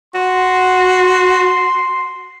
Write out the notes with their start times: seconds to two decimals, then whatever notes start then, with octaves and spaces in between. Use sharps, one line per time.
0.15 F#4 C6